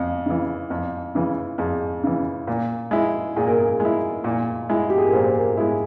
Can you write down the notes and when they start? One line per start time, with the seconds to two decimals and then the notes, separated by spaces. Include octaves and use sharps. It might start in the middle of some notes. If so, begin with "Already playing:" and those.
Already playing: F2
0.26 C#3 E3
0.70 F2
1.15 C#3 E3
1.58 F2 G#4
2.04 C#3 E3
2.47 A#2
2.91 G#3 E4
3.36 A#2 G#4
3.47 A#4
3.58 G#4
3.80 G#3
3.85 E4
4.24 A#2
4.70 G#3 E4
4.90 G4
4.98 G#4
5.05 A#4
5.13 A#2 C5
5.35 A#4
5.57 G#3 E4 G#4